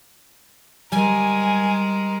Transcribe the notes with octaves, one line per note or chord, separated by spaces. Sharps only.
G3 G#3 A#4 G#5